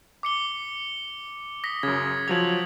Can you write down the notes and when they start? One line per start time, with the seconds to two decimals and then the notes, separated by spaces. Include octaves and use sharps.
0.23 D6 C#7 G7
1.64 D#6 A#6 B6
1.83 F#2 C#3 G#6
2.28 F3 F#3 G#6 F7 F#7